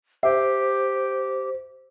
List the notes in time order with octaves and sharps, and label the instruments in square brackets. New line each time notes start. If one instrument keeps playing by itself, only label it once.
[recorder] G4 [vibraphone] C5 [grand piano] E5